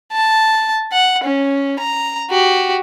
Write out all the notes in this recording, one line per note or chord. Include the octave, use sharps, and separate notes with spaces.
A5
F#5
C#4
A#5
F#4 G4